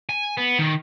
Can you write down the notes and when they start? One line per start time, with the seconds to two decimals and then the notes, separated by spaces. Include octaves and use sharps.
0.09 G#5
0.37 B3
0.59 D#3